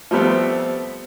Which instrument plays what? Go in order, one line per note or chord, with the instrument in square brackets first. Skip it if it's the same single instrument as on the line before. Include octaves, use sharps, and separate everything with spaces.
[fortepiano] F3 G3 A3 B3 C4